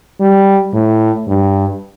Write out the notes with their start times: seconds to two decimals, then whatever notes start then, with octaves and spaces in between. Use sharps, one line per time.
0.21 G3
0.74 A2
1.28 G2